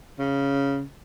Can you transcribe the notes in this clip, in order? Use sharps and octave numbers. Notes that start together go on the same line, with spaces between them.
C#3